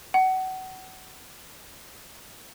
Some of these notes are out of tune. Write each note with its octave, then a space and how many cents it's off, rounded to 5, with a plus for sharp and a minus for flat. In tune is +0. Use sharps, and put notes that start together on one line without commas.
F#5 +25